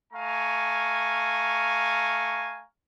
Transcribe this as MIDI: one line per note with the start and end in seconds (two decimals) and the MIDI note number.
0.13 2.63 57
0.13 2.63 77
0.13 2.63 80
0.13 2.63 82
0.13 2.63 85